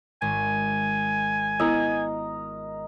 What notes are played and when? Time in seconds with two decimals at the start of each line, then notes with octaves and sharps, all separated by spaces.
0.22 G#1 G#5
1.60 B3 E4 A#4 D#5 E6